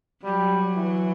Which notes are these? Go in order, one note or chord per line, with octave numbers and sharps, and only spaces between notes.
F#3 G3
E3